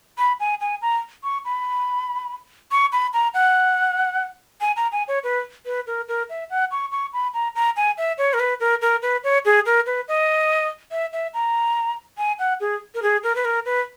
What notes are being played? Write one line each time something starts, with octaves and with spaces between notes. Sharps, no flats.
B5
G#5
G#5
A#5
C#6
B5
C#6
B5
A#5
F#5
G#5
A#5
G#5
C#5
B4
B4
A#4
A#4
E5
F#5
C#6
C#6
B5
A#5
A#5
G#5
E5
C#5
A#4
B4
A#4
A#4
B4
C#5
G#4
A#4
B4
D#5
E5
E5
A#5
G#5
F#5
G#4
A#4
G#4
A#4
B4
A#4
B4